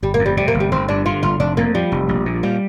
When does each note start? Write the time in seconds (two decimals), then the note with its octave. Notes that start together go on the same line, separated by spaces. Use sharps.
0.03 G1 G3
0.14 A#3
0.19 F2
0.26 G3
0.37 C3 G3
0.48 A#3
0.54 G1
0.60 G3
0.71 G1 C4
0.88 G2 D4
1.05 D3 F4
1.23 G1 F4
1.40 F1 D4
1.57 F2 A#3
1.75 F3 G3
1.92 F1
2.09 A#1
2.26 A#2
2.43 F3 G3